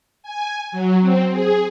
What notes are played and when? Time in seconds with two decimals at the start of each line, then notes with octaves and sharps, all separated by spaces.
0.23 G#5
0.72 F#3
1.01 C4
1.31 G#4